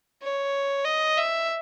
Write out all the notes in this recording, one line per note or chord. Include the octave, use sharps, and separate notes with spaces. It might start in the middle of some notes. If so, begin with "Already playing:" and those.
C#5
D#5
E5